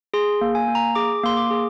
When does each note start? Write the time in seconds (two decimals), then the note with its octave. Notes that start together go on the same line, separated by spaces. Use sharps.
0.14 G#4 C6
0.41 A#3
0.55 G#5
0.68 A#3
0.75 A#5
0.95 G#4 D6
1.23 A#3 C6
1.37 D6
1.50 G#4